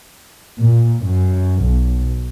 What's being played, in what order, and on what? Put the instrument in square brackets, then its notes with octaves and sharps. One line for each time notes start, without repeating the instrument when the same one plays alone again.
[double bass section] A#2
F#2
B1